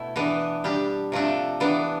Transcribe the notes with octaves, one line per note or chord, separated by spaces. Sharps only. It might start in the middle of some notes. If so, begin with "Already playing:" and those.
Already playing: B2 A3 E4
E3 B3 D4
G3 D4 G4
C3 F3 A3 D4
E3 B3 D4